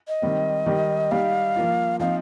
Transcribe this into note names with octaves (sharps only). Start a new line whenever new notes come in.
D#5
D#3 G3 C4
D#3 G3 D#4 G4
G3 D#4 G4 F5
F3 A#3 F4
F3 C4 D#4 F5